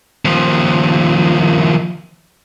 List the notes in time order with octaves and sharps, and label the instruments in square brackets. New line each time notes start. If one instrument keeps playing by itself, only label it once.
[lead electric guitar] D#2 F3